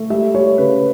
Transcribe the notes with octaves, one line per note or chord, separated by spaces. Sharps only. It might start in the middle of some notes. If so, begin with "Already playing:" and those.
Already playing: A3
G3 E5
G3 C#5
C#3 B4